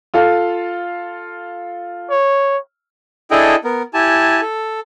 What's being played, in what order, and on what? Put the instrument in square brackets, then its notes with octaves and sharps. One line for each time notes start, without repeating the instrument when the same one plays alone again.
[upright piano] F4 A4 F5
[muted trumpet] C#5
[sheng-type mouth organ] D4 E4 G#4 A4 D#5 G5
B3 A#4
E4 G4 G#5 A5
A4